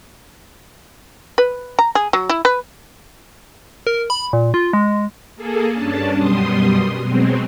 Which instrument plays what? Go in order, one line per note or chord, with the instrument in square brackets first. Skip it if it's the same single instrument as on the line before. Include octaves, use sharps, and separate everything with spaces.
[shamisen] B4
A#5
G#4
F#3
E4
B4
[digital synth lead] A#4
B5
A#2
F4
G#3
[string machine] A#3 G#4 A4
G2 C#4 D4 A5
F#2 B2 G3 C6 D#6
B2 F#3 G#3 C4